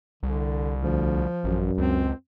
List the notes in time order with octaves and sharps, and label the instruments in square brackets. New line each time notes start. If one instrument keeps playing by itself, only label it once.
[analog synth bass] C2 [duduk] D3
[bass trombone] D2 [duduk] F3
[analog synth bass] A1 [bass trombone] F#2
[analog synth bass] C#2 [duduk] C4